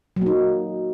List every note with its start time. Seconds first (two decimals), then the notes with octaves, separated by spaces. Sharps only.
0.16 F#3
0.21 A#3
0.26 D#4